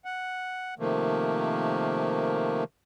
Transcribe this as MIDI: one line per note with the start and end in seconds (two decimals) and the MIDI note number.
0.05 0.74 78
0.79 2.64 48
0.79 2.64 51
0.79 2.64 53
0.79 2.64 57
0.79 2.64 58